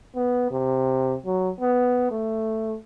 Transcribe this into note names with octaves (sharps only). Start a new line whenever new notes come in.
B3
C3
F#3
B3
A3